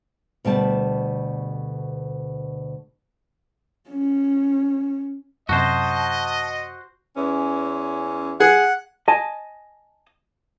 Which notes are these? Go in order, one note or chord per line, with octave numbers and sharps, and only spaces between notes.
D2 B2 G3 A5
C#4
F#2 C3 F#4 C5 D#5 A5
E2 C#4
G#4 F#5
D#5 G#5 A5